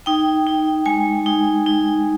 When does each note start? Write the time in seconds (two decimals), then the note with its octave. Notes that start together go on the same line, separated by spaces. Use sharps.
0.06 D#4 G5
0.47 D#4
0.86 G#3 G#5
1.26 D#4
1.66 D#4